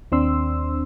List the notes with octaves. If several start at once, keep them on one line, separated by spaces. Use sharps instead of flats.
D#2 C4 D4 C6 E6